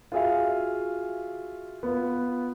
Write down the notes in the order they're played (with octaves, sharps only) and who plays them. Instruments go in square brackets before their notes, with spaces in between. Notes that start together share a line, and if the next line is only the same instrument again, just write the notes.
[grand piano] F4 F#4 G#4 E5 F5
B3 F4